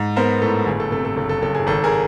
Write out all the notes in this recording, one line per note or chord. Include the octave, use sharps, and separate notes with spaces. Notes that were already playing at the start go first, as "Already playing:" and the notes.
Already playing: G#2
B3 A#4 C5
A2 A4
G1 G#4
A4
C3 A4
A4
F#1 A4
A4
F#1 A4
G#4
G#1 A4
G#4 A#4